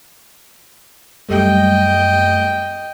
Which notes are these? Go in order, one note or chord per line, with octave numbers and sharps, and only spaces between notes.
F#2 G3 A3 D#5 G5